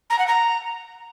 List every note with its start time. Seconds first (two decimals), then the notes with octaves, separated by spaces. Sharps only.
0.10 A#5
0.19 F#5
0.27 A#5